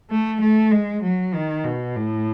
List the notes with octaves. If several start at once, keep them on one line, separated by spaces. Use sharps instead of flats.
A3
A3
G#3
F#3
D#3
B2
A2